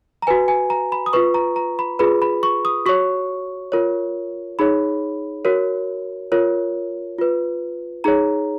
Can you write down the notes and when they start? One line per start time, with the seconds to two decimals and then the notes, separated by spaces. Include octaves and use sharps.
0.22 A#5
0.27 F#4 B4 G#5
0.48 G#5
0.70 A#5
0.92 B5
1.06 D#6
1.13 F4 B4 C#6
1.34 A#5
1.56 A#5
1.79 B5
1.99 F4 G#4 B4 B5
2.22 B5
2.43 C#6
2.65 D#6
2.86 F#4 C#5 C#6
3.72 F4 A#4 C#5
4.59 D#4 G#4 C#5 B5
5.45 F#4 A#4 C#5
6.32 F4 A#4 C#5
7.18 F4 B4
8.04 D#4 G#4 C#5 A#5